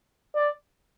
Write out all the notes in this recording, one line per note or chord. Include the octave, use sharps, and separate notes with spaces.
D5